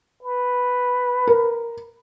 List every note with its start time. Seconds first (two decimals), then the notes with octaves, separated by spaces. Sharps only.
0.23 B4
1.27 A#4